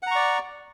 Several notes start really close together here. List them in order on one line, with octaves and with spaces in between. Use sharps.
F#5 A#5 C#6 D5